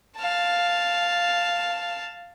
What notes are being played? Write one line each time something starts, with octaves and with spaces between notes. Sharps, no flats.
F5 A5